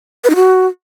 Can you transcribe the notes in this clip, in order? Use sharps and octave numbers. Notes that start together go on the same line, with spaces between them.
B4
D#4
F#4